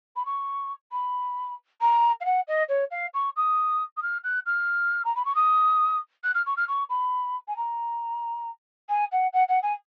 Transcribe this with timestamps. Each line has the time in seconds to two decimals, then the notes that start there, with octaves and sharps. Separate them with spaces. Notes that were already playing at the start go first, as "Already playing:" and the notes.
0.16 B5
0.25 C#6
0.92 B5
1.81 A#5
2.20 F5
2.25 F#5
2.47 D#5
2.68 C#5
2.91 F5
3.13 C#6
3.36 D#6
3.96 D#6
4.02 F6
4.23 F#6
4.46 F6
5.04 A#5
5.15 B5
5.25 C#6
5.35 D#6
6.23 F#6
6.34 F6
6.46 C#6
6.57 F6
6.68 C#6
6.89 B5
7.48 G#5
7.56 A#5
8.89 G#5
9.11 F#5
9.33 F#5
9.48 F#5
9.62 G#5